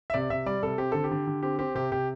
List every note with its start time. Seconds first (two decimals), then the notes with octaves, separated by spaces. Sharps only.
0.10 E5
0.14 C3 D5
0.30 C3 E5
0.46 G3 D5
0.63 C3 A4
0.78 C4 G4
0.92 D3 A4
1.04 G4
1.11 D3
1.27 D3
1.43 C4 G4
1.59 C4 G4
1.75 C3 G4
1.92 C3 G4